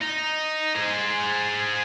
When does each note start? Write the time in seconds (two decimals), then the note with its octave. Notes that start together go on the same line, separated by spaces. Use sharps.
0.02 D#4
0.75 G#4 C5